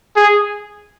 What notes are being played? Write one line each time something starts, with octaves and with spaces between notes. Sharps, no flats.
G#4